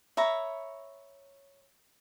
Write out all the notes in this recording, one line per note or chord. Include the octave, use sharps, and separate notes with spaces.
C#5 E5 A#5 B5